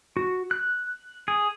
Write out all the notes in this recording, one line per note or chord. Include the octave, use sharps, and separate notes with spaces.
F#4
F#6
G#4